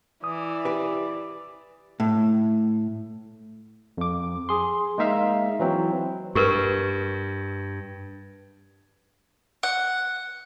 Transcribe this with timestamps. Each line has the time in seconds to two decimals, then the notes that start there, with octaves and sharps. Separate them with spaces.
0.24 E3 D5 D#6
0.65 G4 B4
2.00 A2
3.97 F2 D6
4.49 G#4 C6
4.98 G#3 A#3 D#4 E5 F5
5.60 E3 F#3 C4
6.35 G2 G4 A#4 B4
9.63 F#5